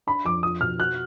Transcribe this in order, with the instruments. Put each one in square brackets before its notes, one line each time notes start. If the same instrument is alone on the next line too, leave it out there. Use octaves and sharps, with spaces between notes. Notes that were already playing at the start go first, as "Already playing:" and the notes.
[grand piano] D4 [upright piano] B5
[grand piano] F2 [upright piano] D6
[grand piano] F4 [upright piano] D#6
[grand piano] B2 [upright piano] F6
[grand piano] F#4 [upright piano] F#6